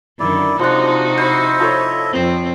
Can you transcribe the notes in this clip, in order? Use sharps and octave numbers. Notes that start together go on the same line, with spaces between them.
F#2 D3 D#3 E4 D5
C3 F3 G#3 D4 D#4 F#4
E4 C5 D#5 E5
F3 A4 C#5
F2 C4